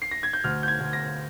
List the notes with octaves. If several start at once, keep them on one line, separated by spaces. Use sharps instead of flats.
C7
A#6
G#6
G6
D2 F6
G6
G#6
D2
A#6